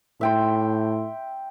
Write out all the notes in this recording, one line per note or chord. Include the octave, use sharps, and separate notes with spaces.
A2 E5 G5 C6